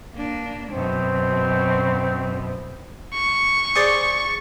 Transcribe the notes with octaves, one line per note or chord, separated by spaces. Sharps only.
A#3 D4
F#2 B2 C4
C#6
G#4 C5 D5